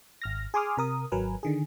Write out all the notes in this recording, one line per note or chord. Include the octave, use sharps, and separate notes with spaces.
G#1 F6 A#6
G#4 G#5 C6 D6 D#6 F6
C3 A#4 D#6
G#1 F#3 A#4 B4 G#5
D3 D#3 G#4